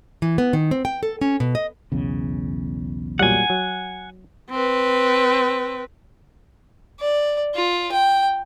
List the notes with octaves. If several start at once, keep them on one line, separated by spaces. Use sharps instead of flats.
E3
B3
D#3
C4
G5
A4
C#4
B2
D#5
B1 E2 C#3
A#2 F#3 G3 F#5 G#5
F#3
C4 B4
D5
F4
G5